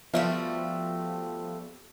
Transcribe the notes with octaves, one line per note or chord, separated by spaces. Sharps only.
F3 G3 A3 B3 F#4 E5 F5